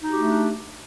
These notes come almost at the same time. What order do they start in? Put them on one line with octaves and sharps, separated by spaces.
D#4 F#4 G4 A3 D4